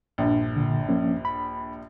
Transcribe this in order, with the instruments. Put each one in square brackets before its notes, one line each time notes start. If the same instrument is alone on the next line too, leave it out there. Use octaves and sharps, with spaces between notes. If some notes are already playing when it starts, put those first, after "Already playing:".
[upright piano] A#1 G2
[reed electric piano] A#2 D3
F3 A#3 C#4
B5